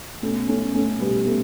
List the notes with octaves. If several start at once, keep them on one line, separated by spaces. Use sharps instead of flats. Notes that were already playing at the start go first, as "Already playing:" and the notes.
B2 A3 C#4
A3 C#4
A3 C#4
B2 G3 B3
A3